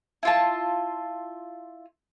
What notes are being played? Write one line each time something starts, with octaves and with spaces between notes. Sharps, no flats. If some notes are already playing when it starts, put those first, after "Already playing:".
E4 F4 A5